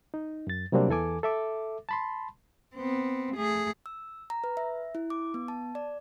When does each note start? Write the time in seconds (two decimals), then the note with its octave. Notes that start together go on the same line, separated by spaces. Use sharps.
0.14 D#4
0.47 F#2 A6
0.72 C3 F#3 G3 A#3 C4 D4
0.88 E2 E3 A4 G#5 D6
1.23 A4 E5 D6
1.89 A5 B5 C6
2.75 B3 C4
3.35 A3 G#4
3.86 E6
4.30 A#5
4.44 B4
4.57 E5
4.95 E4
5.10 D6
5.34 B3
5.48 A5
5.75 D5